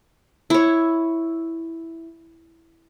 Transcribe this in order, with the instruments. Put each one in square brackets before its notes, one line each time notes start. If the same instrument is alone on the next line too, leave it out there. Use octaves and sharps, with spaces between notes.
[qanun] E4 C#5